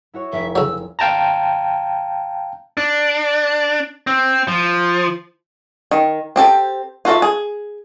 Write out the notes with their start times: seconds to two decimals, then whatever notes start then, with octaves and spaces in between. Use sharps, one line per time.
0.14 E4 F#4 C#5
0.32 F1 E5 D7
0.56 C#3 F#3 E6
0.99 F5 G5 A5 A#5
2.77 D4
4.07 C4
4.48 F3
5.91 D#3
6.36 C4 G4 A4
7.05 F4 F#4 A4 E5
7.22 G#4